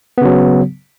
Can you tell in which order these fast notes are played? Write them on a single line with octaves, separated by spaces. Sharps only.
B3 C#3 F#3